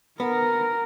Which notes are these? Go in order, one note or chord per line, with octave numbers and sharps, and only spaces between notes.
B3 A#4